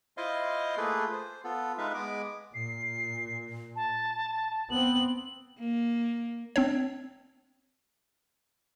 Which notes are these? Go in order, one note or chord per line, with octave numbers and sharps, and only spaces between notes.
E4 F4 C5 D#5 F5 C6
A3 A#3 F4 G#4 A4 B4
C5
B3 F4 A4
G#3 D#4 B4 E5 F5
G#3 B3 D6
A#2 C7
A5
B3 C4 F#7
A#3
C4 D4 C#5